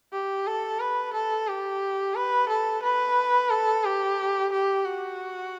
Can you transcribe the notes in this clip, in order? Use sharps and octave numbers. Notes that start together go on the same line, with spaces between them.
G4
A4
B4
A4
G4
B4
A4
B4
A4
G4
G4
F#4